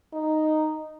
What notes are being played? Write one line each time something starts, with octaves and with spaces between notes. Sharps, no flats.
D#4